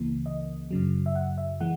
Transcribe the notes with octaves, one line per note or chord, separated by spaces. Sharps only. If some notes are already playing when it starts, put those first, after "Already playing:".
Already playing: C#2 C#3 E3 A#3
D#5
F#2 C#3 F#3
E5
F#5
E5
E3 G#3 F#5